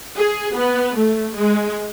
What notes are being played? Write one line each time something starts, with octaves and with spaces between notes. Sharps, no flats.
G#4
B3
A3
G#3